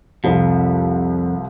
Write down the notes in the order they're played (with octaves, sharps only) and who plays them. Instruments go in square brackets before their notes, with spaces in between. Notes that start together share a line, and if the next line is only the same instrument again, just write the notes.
[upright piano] C2 F3 B5 [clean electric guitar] F2